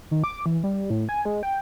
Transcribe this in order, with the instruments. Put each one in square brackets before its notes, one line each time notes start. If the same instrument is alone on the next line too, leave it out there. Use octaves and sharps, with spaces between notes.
[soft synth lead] D#3
D6
E3
G3
A2
G#5
G#3
G5